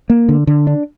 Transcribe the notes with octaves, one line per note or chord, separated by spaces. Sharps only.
A#3
D3
D3
D4